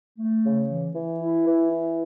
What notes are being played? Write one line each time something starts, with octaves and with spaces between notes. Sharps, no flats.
A3
C#3
E3
E3
E4
E3
E4